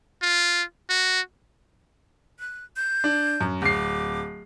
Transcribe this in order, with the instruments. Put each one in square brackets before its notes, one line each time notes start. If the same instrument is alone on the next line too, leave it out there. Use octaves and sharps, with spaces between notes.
[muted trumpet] F4
F#4
[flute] F#6
G6
[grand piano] D4
F#2
[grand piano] D1 C7 [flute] D6